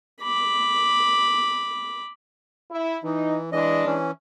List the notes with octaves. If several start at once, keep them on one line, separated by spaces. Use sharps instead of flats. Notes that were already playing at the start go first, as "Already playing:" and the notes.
B5 D6
E4
E3 D#4
E3 G#3 D4 D#5
E3 C#4